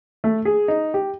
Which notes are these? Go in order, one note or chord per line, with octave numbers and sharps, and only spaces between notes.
A3
G#4
D#4
G4